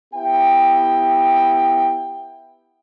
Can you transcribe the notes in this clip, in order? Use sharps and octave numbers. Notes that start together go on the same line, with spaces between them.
B3 E4 G4 G5